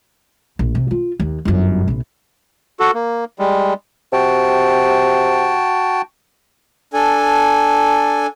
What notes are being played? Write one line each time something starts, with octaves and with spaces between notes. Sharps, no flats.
A#1
C3
F4
D#2
G1 F#2
A#1 C3
F#4 A4
A#3
G3 G#3
C3 F#4 G5 A5
D4 A4 G#5